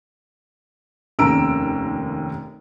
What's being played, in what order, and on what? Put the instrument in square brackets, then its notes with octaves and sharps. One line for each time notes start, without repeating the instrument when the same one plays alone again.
[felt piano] F1 D#2 C#4 A#5 E6 D7